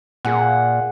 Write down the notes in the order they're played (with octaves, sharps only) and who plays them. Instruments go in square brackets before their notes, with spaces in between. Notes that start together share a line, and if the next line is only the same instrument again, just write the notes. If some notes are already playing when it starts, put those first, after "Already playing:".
[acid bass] A#2 [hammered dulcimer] G#4 F#5